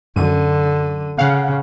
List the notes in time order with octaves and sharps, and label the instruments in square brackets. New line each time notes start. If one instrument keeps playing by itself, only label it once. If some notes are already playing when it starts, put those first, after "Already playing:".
[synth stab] F#2 D#7 [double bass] D3
[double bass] C#3 [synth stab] F5 F#5